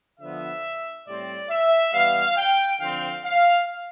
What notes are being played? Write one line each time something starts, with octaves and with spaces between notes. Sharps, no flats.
D3 F3 B3 E5
A2 G3 C4 D5
E5
E3 G3 B3 F5
G5
D3 F3 C4 F5
F5